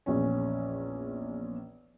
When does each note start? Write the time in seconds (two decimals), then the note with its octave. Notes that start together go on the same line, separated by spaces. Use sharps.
0.06 A#1 E2 C#4